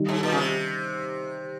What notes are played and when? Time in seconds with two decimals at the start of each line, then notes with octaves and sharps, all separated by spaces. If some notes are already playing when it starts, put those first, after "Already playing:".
Already playing: D#3 G3
0.09 G#2
0.23 A#2
0.32 C#3
0.38 C3